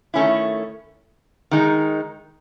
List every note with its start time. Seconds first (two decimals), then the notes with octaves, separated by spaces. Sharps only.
0.14 D#3 A3 C#4 E4
1.51 D#3 G#3 D#4